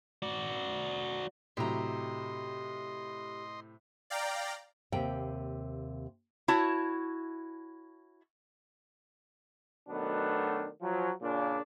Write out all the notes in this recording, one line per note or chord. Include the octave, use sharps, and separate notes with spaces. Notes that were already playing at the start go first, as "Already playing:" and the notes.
F#4 D5
A2 C3 F#3 G4 D#5 A#5 C6
D5 F5 G5 A#5
D#2 C3 A#3 G5
E4 F#4 C#5 A5
B2 D#3 F#3 A3 B3 D4
F3 F#3
A#2 C#3 D4